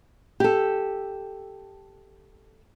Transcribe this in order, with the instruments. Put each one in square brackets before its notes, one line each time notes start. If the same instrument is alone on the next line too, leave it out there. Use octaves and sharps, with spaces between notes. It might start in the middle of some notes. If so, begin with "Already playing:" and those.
[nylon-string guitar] G4 A4